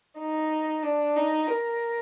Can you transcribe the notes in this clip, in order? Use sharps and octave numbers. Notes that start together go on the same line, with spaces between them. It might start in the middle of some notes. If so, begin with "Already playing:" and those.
D#4
D4
D#4
A#4